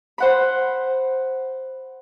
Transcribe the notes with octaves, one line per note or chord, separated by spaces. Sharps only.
C5 F#5 B5